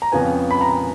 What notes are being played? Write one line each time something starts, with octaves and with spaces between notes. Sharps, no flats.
A#5
F2 C#3 F3 B3 G#5
B5
A#5